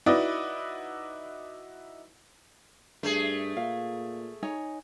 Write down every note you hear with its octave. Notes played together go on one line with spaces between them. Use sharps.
D#4 E4 F#4 B4 D5 D#5
G2 A3 G#4
A#2 F5
D#4 C#5 G#5